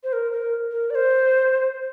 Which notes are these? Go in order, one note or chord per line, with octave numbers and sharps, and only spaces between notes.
C5
A#4
A#4
A#4
D5
C5